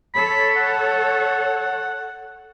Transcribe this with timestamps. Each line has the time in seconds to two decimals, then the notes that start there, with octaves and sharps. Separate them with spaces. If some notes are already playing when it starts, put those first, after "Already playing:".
0.14 A4 C#5 B5
0.57 F#5